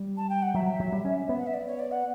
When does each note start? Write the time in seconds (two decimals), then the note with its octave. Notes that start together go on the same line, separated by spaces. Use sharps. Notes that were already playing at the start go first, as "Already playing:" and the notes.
Already playing: G3
0.17 A5
0.29 G5
0.42 F#5
0.55 F#3 E5
0.80 F#3
0.92 G3
1.05 C#4
1.29 B3
1.39 F#5
1.46 E5
1.54 D5
1.67 C#5
1.79 D5
1.91 F#5